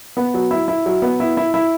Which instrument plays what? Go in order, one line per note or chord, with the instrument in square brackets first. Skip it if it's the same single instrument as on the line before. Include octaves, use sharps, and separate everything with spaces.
[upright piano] B3
F#3
E4
E4
F#3
B3
E4
E4
E4